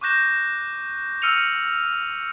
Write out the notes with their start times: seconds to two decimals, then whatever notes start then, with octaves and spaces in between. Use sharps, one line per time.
0.01 C#6 D6 F#6 G6 A#6 E7
1.22 E6 F6 C#7 D#7 F7